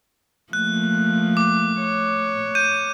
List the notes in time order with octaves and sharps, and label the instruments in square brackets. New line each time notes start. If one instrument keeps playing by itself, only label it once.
[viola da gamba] F3 A3 A#3 [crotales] F#6
[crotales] D6
[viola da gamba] C#5
[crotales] G6 D#7